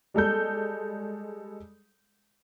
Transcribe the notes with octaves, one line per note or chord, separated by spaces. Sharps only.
G3 G#3 A4 G6